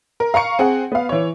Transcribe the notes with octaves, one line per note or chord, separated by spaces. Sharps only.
A#4
F5 A#5 C#6 C#7
C4 G#4 F#5
B3 F5
E3 C#5